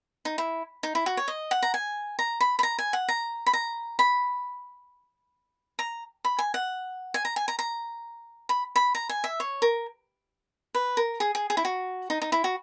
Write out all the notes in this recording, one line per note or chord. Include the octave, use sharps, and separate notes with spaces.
D#4
E4
D#4
E4
F#4
C#5
D#5
F#5
A#5
G#5
A#5
B5
B5
A#5
G#5
F#5
A#5
B5
A#5
B5
A#5
B5
G#5
F#5
G#5
A#5
G#5
A#5
A#5
B5
B5
A#5
G#5
E5
C#5
A#4
B4
A#4
G#4
G#4
G#4
E4
F#4
D#4
D#4
E4
F#4